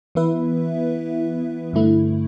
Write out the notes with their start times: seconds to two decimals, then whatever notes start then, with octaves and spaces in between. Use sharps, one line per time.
0.15 E3 B3 E4 B4 E5
1.73 G2 D3 A3 E4